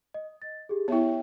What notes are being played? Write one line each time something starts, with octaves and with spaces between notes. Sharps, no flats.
D#5
A6
G4 G#4
B3 E4 C#5 E5 G5